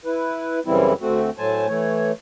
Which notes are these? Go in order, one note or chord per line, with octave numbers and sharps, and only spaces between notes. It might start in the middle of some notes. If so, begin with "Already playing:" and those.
E4 B4
F#2 C#3 E3 G3 C4 E4
D2 A3 C4 F#4
A2 F#3 A3 C5 G#5 A5
E3 A3 C#5